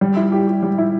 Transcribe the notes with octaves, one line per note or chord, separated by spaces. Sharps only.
G3
E4
G4
G4
G3
E4